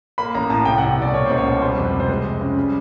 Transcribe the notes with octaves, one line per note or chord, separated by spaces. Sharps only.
A#3 B5
A1 A#5
A2 A5
C2 G5
F#5
C2
B2 D5
A#3 C#5
C#2 C5
C#5
B2
G3 C5
F2
B4
C3
C5
G#3 B4
F2
C#3
G3